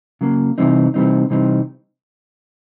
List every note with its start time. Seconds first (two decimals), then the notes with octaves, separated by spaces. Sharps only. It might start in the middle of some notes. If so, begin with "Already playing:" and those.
0.21 C#3 F#3 A#3
0.58 C3 E3 G3 C4 D#4
0.94 C3 E3 G3 C4 D#4
1.30 C3 E3 G3 C4 D#4